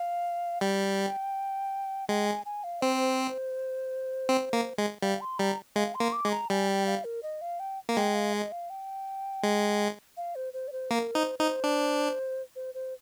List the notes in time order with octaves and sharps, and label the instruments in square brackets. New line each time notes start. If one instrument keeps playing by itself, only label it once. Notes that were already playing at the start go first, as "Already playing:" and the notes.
Already playing: [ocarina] F5
[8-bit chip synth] G3 [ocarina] G5
[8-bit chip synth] G#3 [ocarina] G5
[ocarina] G#5
G#5
F5
[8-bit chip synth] C4 [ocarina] C5
[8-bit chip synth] C4
A#3
G#3
[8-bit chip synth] G3 [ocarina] F5
[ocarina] C6
[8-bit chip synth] G3 [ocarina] A#5
[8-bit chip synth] G#3 [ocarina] F5
[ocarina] C6
[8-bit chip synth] A#3
[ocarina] D6
[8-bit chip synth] G#3
[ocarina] A#5
[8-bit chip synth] G3 [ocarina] G#5
[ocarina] G5
F5
A#4
D#5
F5
G5
[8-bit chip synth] A#3
[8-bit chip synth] G#3 [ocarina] G5
[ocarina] F5
D#5
F5
G5
[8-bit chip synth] G#3
[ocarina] F5
C5
C5
D5
C5
[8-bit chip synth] A#3 [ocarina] A#4
[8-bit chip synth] D#4 [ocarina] C5
[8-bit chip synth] D#4 [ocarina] C5
[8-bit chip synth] D4
[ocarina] C5
C5